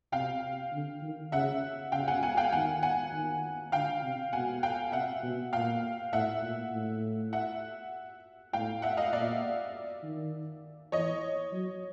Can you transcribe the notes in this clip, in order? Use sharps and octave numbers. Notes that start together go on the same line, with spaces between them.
C3 F5 G5
D3
D#3
C#3 E5 F#5
C#3 F5 G5
F#5 G#5
F#5 G#5
F5 G5
D#3 F#5 G#5
F#5 G#5
D#3
D3 F5 G5
C3
B2 F#5 G#5
F5 G5
C3 E5 F#5
B2
A#2 F5 G5
A2 E5 F#5
A#2
A2
E5 F#5
A2 F5 G5
E5 F#5
D#5 F5
A#2 D5 E5
D#3
E3 C#5 D#5
F#3